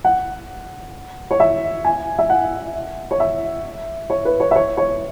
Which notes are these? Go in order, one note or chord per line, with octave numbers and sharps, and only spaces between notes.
F#5
C#5
E5
G#5
E5
F#5
C#5
E5
C#5
B4
C#5
E5
C#5
C#5